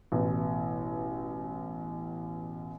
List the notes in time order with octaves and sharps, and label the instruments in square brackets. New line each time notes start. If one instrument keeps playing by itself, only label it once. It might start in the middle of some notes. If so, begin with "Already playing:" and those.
[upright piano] A1 B2